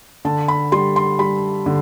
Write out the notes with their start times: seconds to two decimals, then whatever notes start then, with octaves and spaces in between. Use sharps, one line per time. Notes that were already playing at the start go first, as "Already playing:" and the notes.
0.25 D3 A5
0.48 B5
0.72 G3 C6
0.96 C6
1.19 G3 B5
1.66 D3